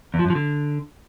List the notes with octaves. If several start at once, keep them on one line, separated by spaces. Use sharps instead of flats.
E2
F3
F#2
F3
D3